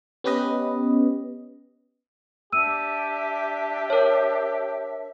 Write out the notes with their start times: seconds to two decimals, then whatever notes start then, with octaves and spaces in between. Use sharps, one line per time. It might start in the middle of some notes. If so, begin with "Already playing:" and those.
0.24 B3 C#4 G4 B4 D#5
2.53 D4 G4 E5 E6 D#7
3.90 A#4 C#5